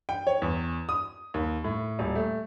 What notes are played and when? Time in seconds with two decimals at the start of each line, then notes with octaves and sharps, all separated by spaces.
0.09 G5
0.27 C#5
0.42 E2
0.89 D#6
1.34 D#2
1.64 A2
1.99 D#1
2.16 A3